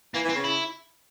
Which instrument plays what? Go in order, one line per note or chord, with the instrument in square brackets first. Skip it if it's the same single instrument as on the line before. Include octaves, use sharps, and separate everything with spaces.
[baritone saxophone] E3 [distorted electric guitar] A#3
[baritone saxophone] E3
[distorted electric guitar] C4
[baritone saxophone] C#3
[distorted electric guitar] E4